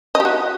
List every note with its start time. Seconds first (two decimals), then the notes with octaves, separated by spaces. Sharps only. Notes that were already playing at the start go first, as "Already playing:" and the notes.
0.15 D#5
0.20 G4
0.25 F#4